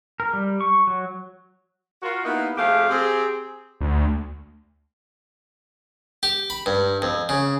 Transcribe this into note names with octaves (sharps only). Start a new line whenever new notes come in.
A#4
G3
C#6
F#3
F4 F#4 A#4
A#3 B3 D#4 E4 G4 A#4
F2 A3 G4 G#4 F5
C4 G4 G#4
D2
G4
B5
G2
F2
C#3